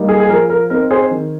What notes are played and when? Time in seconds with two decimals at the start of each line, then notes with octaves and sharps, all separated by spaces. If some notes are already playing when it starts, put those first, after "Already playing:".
Already playing: G3 A#3 D#4
0.09 G#4
0.20 G#4
0.29 F3 A#4
0.50 A#4
0.70 C4 D#4 A#4
0.91 G#4 C5
1.11 D#3